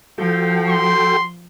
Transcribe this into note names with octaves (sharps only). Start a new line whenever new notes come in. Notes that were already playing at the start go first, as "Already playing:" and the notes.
F3 F#4 A4 G5
C6